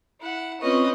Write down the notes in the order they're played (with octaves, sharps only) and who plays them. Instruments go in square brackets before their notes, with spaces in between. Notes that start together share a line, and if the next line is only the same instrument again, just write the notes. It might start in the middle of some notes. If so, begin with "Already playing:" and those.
[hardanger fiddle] E4 F#5
[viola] C4 B4 [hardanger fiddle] C#4 D#5 [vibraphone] F4 C#6